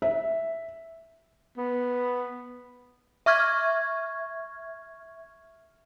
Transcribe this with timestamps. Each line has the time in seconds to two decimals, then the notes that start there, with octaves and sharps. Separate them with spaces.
0.02 E5
1.57 B3
3.26 E5 C#6 F6 G#6